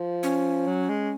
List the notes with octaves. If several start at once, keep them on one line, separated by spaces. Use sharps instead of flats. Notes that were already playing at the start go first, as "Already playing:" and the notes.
Already playing: F3
C#4
F#3
G#3